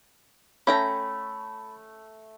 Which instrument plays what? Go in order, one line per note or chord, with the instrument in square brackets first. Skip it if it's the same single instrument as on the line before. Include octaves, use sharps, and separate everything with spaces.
[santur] A3 [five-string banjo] C#4 G5 A#5 [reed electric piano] B5